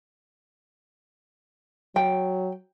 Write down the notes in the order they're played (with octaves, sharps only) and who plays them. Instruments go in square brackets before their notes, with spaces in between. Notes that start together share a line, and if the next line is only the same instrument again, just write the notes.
[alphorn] F#3 [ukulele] G5